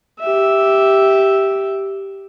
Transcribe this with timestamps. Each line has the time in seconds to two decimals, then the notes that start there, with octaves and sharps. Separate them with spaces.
0.20 G4 E5